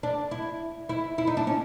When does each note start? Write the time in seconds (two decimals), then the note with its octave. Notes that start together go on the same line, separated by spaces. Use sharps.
0.03 D4
0.31 E4
0.89 E4
1.18 E4
1.27 D#4
1.37 D4
1.47 C#4